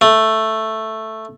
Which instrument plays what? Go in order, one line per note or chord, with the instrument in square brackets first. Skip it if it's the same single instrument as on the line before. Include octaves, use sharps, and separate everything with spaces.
[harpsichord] A3